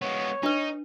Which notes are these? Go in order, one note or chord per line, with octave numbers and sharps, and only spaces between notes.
G#3 B3 C#5
D4 D#4 B4